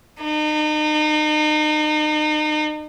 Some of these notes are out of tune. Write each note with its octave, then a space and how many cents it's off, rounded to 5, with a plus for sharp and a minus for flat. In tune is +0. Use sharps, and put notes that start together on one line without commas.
D#4 -35